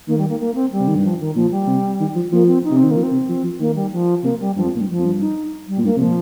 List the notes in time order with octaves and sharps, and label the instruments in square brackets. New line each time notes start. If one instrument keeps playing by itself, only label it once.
[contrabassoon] D#3 [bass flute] A#3
[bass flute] G3
A#3
A#3
C4
G3
[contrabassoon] C3
D#3
G2
[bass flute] F3
D#3
[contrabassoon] A#2 [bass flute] F3
[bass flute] G3
[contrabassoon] C3
D#3
F3
[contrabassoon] F3 [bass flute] A#3
[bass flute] C4
D#4
[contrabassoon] C3
[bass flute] C4
[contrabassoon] D#3
[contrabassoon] F3 [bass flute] A#3
[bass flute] C4
[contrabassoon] C3
F3
F3
[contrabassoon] D#3 [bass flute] A#3
[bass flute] G3
F3
[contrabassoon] C3 [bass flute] A#3
[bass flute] G3
[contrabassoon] G2 [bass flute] F3
[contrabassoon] F2
A#2
G2
[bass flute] F3
[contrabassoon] F2
G2
[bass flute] D#4
G3
[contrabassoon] A#2
[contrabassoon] G2 [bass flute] A#3
[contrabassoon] C3
[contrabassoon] A#2 [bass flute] F3